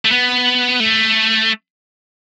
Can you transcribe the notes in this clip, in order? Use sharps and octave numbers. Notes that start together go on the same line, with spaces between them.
A3
B3
A3